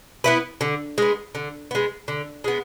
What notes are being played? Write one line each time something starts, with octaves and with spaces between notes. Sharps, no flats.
B3 E4 B4
D3
G#3 B3
D3
G#3 B3
D3
G#3 B3